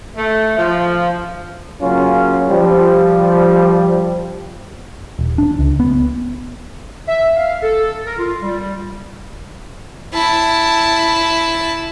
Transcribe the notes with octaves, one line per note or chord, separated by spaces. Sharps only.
A3
F3
C#3 F#3 A#3 C#4 F4
F3 G3
D#1
D4
C#2
B3
E5
F5
A4
A#4
F4
G3
E4 A5